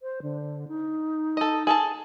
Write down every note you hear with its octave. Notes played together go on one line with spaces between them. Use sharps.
C5
D3
D#4
A4 D#5
G#4 A4 A5